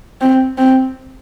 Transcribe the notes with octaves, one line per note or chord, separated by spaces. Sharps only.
C4
C4